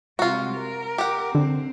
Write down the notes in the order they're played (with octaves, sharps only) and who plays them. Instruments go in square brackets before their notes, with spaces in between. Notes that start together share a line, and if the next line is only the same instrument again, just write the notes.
[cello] C3 G#3 [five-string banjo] F4 F#4
[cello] A#4
[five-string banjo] G4 F#5
[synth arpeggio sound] D3 [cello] C4